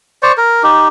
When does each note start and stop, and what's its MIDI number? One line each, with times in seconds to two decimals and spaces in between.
0.23 0.32 72
0.23 0.32 74
0.23 0.32 85
0.37 0.63 70
0.63 0.88 63
0.63 0.88 67